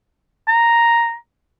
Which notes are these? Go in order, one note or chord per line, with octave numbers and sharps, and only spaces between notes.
A#5